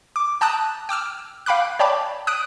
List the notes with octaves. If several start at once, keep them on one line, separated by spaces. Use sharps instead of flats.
D6
G5 A5 A#5 D#6 F#6
G5 D6 E6 F6
F5 G5 B5 D6 F#6
C#5 D5 G5 A5 B5 D6
D#6 F#6 B6 D7 D#7